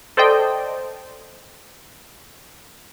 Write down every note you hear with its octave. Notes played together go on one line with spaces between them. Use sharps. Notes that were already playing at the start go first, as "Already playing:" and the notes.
A4 C5 D5 D#5 G5